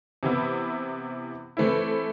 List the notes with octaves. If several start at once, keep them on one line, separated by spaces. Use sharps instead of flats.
C3 E3 B3 E4
E3 A3 C4 E4